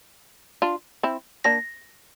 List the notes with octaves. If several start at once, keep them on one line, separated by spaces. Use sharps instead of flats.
D4 F4
C4 E4
A#3 D4 A#6